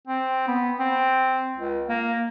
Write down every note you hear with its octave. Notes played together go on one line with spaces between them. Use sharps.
C4
B3
C4
C#2
A#3